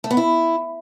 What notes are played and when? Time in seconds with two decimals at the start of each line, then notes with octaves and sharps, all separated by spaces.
0.04 A3
0.11 B3
0.17 E4